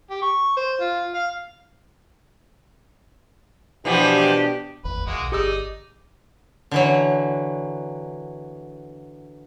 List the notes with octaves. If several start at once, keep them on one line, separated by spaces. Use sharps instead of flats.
G4
C#6
C5
F4
F5
B2 E3 F3 B3 D4 G4
D1 G#1 E2 B4
D#1 G#3 A#3 F#4
B1
G1 D#4 G4 G#4 D5 D#5 E6
D3 E3 F#3